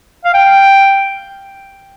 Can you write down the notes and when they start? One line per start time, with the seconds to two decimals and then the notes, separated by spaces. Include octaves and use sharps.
0.25 F5
0.34 G5